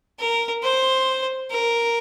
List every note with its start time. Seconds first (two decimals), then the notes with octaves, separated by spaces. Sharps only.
0.19 A#4
0.63 C5
1.51 A#4